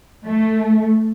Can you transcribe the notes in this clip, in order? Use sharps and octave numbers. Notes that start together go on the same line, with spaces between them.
A3